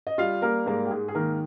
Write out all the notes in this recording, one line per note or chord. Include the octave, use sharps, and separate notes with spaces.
D#5
G3 F4 F5
G3 A#3 A#4
G#2 A#3 A#4
G4
G#2 G#3 G#4
G#4
D#3 A#3 A#4